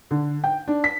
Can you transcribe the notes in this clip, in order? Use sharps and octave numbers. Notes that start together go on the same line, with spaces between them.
D3
G5
D4
B6